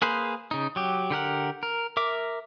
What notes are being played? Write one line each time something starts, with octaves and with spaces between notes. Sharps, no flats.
A#3 G#4 B4 C5
C#3 D#4
F#3 G4
D3 G4 A#4 F#5
A#4
A#4 E5 D6